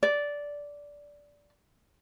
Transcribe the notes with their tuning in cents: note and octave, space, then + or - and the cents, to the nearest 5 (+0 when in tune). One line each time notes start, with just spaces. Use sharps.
D5 -10